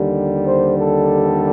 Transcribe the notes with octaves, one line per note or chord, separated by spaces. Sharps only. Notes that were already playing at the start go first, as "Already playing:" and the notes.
Already playing: D#2 D3 G3
C5
A4